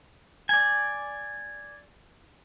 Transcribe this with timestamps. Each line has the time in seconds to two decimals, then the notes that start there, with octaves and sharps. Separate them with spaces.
0.49 D5 G#5